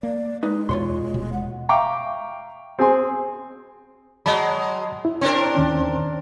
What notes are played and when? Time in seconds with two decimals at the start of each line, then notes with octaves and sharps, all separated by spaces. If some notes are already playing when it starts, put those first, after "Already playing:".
0.03 A#3 D5
0.43 G#3 D#4 B4
0.69 E2 B2 F4 C#5 C6
1.14 D#1 B2
1.33 F#5
1.69 E5 F5 G5 A#5 C#6 D6
2.79 C4 G#4 C5 G#5 C6
4.26 F#3 G#3 D#5 A5 B5
5.05 E4
5.21 C4 D4 A#4 C#5
5.55 D#2 D#3 C#4